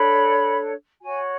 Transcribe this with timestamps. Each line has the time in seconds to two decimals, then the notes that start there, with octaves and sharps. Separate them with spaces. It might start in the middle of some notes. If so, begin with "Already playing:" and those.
Already playing: D4 A4 C#5 B5
1.01 F#4 C#5 G#5